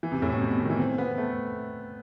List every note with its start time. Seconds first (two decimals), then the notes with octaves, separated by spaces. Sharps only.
0.03 E3
0.12 C3
0.22 A2
0.32 B2
0.41 C3
0.51 B2
0.60 D#3
0.70 E3
0.79 C4
0.98 B3
1.18 A3